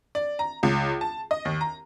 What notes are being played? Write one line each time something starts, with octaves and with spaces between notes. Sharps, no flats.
D5
A#5
C#2
A5
D#5
D#2
A#5